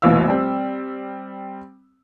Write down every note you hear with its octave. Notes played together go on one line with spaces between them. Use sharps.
F1 A#1 B2 E3 F5 E6
G3 C4